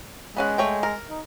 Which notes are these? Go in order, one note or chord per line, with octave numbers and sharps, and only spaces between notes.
G#3 B3 C#4 F#5
A3 C#5 G5
A#4
D#4